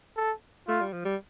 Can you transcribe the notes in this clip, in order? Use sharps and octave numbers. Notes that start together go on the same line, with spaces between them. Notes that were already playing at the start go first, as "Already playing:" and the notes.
A4
A3 F4
G3
F3
G3